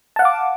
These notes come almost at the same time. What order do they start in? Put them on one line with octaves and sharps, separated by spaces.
A5 F#5 F5 D6